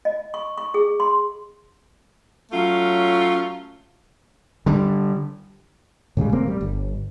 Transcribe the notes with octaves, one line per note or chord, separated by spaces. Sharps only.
D#5
C#6
C#6
G#4
C6
F#3 A3 C#4 F4
D3 G3
A2 C#3 G3 G#3
D#1 A3 A#3 C4
G3
G1